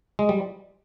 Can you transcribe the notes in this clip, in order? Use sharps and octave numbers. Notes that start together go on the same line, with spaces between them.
G#3
G3